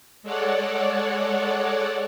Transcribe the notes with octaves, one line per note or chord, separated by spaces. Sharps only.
G#3 A4 C#5 D5 F#5